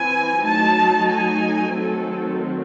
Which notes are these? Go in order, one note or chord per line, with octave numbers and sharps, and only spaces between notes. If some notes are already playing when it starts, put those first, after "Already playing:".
Already playing: E3 C4 E4 G#5
F#3 A3 D#4 A5
G#5
D#3 F#3 A3 C4 A4